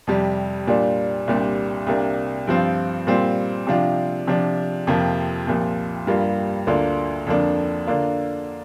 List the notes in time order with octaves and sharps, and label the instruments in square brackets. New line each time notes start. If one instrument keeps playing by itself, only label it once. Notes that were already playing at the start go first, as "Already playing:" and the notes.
[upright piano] F2 C3 G3
A#2 G3 D4 F4
C2 A#2 G3 D4
C2 C3 A#3 D4
G2 F3 C4 F4
A#2 G3 C4 F4
C3 F3 D4 F4
C3 F3 D4
F2 C3 F3 A#3
C2 A#2 F3
G2 G3 A#3 F4
D2 D3 A#3 D4 F4
F2 D3 F3 A#3 D4
D3 A#3 D4 F4